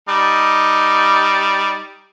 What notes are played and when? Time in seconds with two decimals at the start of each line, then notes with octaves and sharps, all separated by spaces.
0.09 G3 D#4